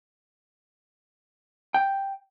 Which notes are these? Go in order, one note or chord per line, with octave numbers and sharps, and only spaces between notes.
G5